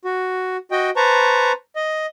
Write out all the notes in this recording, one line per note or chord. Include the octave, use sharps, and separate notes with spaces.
F#4
F#4 D#5 G5
B4 C5 A5 A#5 C#6
D#5